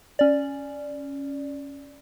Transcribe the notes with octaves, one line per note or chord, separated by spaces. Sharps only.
C#4 D5